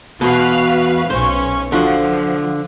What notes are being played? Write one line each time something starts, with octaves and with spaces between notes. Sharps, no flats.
E2 B2 F#4 B4 F5
B1 C#4 C5 C#6
D3 F3 F4 F#4